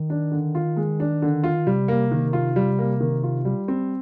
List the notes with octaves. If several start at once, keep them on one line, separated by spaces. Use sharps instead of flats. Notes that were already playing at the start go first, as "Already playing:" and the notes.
Already playing: D#3
D4
D3
F4
G#3
D4
D3
F4
C3 G3
A#3
D#3
F4
G3
A#3
D#3
F4
G3
C4